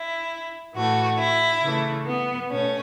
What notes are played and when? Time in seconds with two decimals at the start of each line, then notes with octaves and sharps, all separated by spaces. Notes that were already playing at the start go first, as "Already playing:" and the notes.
Already playing: E4
0.75 A2 E3 A3 F#4
1.18 E4
1.62 C#3 E3 A3
2.07 B3
2.50 B2 A3 C#4